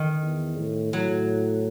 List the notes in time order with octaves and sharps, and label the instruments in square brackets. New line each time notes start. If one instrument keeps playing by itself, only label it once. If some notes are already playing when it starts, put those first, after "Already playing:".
Already playing: [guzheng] D#3
[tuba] E2
A2
[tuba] A2 [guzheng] F#3